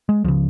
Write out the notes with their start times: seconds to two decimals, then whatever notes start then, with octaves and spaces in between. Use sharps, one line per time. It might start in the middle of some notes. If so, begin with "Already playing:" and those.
0.09 G#3
0.24 C#2 C#3 F3